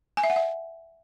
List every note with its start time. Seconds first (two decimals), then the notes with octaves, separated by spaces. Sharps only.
0.17 G#5
0.24 E5
0.30 F#5
0.36 E5